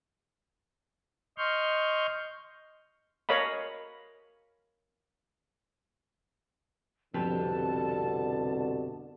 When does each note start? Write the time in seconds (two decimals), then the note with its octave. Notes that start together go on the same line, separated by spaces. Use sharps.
1.38 D#5 C6 C#6 F6 G6
3.29 A#4 C#5 D#5 F5 B5
7.14 C2 F2 B2 D3 G4 B4 A5